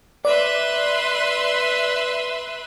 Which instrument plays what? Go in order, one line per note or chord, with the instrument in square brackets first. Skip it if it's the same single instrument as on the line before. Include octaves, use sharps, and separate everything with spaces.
[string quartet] B4 E5 C6 [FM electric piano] D5